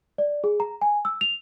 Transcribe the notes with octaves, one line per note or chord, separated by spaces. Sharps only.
D5
G#4
A#5
G#5
E6
F7